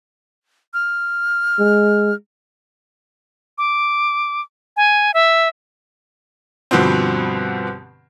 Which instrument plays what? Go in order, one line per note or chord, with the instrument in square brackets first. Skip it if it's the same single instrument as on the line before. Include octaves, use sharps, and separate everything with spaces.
[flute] F6
[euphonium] G#3
[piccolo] D6
G#5
E5
[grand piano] G2 B2 D3 F3 B3 C4